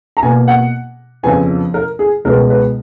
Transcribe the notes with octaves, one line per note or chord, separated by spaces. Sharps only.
A#5
B2 A#3 G#5
F#5
F2 C#3 F3 B3 G#5
A#4
G#4
C#2 B2 G#3 B3 A#4
B4